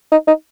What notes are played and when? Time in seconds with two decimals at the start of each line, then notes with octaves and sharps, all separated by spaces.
0.11 D#4
0.27 D#4